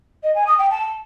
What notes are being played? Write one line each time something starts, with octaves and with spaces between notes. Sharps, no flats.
D#5
G#5
D#6
G5
A5